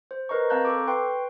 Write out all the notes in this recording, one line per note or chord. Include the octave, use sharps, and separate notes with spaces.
C5
A#4 B4 D#5 A#5 C#6
C4 F5 A5 A#5 F#6 G6
A4 C#6 D6
B4 G5 C6 C#6